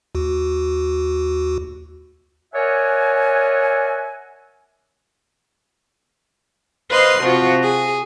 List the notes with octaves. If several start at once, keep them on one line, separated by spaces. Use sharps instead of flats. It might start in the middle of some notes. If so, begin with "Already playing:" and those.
D#2 F#4
A#4 C#5 D5 E5 F#5 G#5
B4 C5 D#5 F5 C6
C3 F3 F4 F#4
G#4